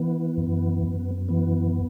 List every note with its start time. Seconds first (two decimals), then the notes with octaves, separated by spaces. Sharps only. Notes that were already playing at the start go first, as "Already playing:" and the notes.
Already playing: E3 B3
0.37 F#2
0.83 F#2
1.29 E3 B3